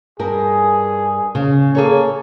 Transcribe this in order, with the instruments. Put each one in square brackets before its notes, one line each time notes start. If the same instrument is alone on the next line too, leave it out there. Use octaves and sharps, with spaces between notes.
[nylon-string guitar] G2 A#4 [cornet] G#4
[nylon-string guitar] C#3
[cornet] A#3 [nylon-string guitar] G#4 A4 C#5